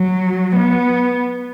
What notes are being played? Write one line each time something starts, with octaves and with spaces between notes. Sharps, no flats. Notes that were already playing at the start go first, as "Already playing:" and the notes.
Already playing: F#3
B3